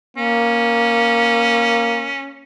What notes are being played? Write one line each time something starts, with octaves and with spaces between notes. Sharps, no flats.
A#3 C#4